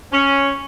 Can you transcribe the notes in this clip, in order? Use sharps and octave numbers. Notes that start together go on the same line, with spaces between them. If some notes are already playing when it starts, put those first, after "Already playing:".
C#4